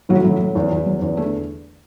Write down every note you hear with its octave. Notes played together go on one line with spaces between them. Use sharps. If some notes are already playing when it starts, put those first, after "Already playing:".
A2 F#3 F#4
A2 F#3
F#3
E2
E2
F#3
E2
D3 A3